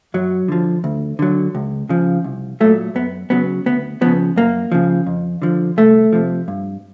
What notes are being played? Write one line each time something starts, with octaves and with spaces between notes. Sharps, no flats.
F#2 F#3
D3 F3
D2
D3 F#3
C#2
C#3 F3
C2
A#2 F#3 A3
F#2 B3
C#3 F#3 B3
D2 B3
C#3 F3 B3
F#2 A#3
C#3 F3
F2
D3 F3
C2 A3
C3 F3
G2